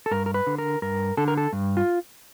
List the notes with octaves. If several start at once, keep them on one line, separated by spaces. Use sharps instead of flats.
A4
G2 A#4
A#4
B4
D3
A#4
G2 A#4
D3 A4
A#4
A4
G2
F4